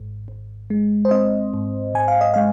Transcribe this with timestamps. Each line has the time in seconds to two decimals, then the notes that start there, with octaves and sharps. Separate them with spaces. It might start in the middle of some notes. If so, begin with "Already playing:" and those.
Already playing: G#1 G#2
0.28 G#1
0.70 G#3
1.05 C5
1.11 C4 D#5
1.54 G#2
1.94 G#2 G#5
2.08 F5
2.21 D#5
2.34 G#3 F5